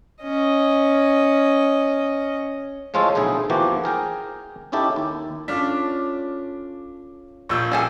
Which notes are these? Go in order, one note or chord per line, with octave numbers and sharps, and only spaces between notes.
C#4 D#5
A2 F3 G#3 F4 A4 C#5
B1 A2 D3 E4 G#4
E2 E3 F3 A#3 F#4 G4
G#4 A#4 G5 G#5
C#4 D#4 E4 G4 A4
D#2 E4
C#4 D4 F4 A4 D6 F6 B6
A#1 A#2 C#6 E6 G6
G3 G#4 A4